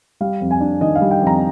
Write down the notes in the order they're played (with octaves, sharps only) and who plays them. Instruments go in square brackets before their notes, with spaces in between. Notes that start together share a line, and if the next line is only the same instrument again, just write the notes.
[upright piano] G3 F5
F2
G#5
D4
D#3 D#5
F5
G3
G5
F2
A#5